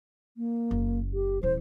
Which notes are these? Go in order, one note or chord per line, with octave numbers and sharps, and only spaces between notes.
A#3
F#1
G4
D#1 E3 C5